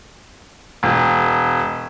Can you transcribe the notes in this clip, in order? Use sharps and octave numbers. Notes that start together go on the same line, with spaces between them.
E1